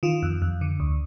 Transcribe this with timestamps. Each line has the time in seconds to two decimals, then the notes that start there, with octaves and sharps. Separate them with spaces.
0.03 D#3 F4
0.23 F2
0.42 F2
0.61 D3
0.80 D2